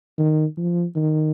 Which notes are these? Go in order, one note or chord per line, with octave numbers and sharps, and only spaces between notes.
D#3
F3
D#3